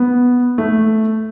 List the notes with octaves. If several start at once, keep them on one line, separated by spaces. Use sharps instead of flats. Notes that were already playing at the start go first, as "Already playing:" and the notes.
Already playing: B3
A3